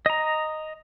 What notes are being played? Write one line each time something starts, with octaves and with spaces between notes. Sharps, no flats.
D#5 A#5